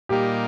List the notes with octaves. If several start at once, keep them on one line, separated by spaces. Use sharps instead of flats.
A#2 G3 A#3 D#4 G4